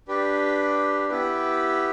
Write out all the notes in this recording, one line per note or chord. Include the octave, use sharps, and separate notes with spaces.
D4 G4 B4
B3 E4 G4 B4